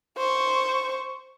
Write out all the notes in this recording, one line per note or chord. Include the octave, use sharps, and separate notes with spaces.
C5 C#6